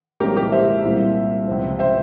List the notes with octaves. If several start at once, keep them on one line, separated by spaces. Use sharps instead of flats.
C2 A#2 F3 G#3 C#4 G4 A#4
G4 A#4
C5 E5
C2 A#2 G3 C4
C#2 C3 F3 C4
C5 E5